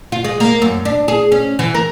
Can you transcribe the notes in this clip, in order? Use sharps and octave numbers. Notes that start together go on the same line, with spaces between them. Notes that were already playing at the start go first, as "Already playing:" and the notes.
F4
G#3
A#3
F#2
D4
G#4
C#4
E3
A#4